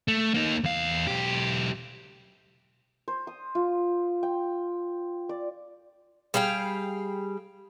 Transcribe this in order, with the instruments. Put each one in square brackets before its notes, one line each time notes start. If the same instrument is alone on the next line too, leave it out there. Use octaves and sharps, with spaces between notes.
[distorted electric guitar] A3
A#3 D#4
E2 F5
B1 G4
[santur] C5
D#6
F4
G5
D5
[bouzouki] G3 G#4 F5 G5